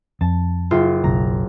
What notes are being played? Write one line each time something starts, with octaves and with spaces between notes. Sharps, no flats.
F2 A5
F#1 F4
F#1 B1 A#5